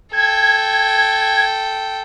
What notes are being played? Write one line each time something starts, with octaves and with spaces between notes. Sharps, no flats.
A4 G5 G#6